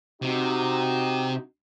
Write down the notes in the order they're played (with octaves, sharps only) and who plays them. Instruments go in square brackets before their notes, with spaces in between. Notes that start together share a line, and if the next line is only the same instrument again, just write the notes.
[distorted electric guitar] C3 [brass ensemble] D#4 F#4